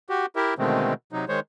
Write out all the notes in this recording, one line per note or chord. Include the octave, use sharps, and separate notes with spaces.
F#4 G4
E4 G4 A#4 E5
B2 D3 D#3 G#3 A3 C4
C3 F#3 D#4
D#3 G#3 C5 C#5